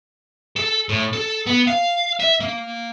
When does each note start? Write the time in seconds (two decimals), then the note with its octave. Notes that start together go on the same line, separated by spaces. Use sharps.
0.56 A4
0.89 A2
1.13 A4
1.47 B3
1.67 F5
2.20 E5
2.40 A#3